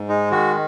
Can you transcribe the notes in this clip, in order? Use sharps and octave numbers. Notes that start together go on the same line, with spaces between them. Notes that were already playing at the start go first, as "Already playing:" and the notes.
Already playing: G#2
G#3 D#4
D#3 F#4